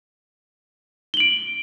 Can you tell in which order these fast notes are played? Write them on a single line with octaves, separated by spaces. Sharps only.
G7 F#7 D7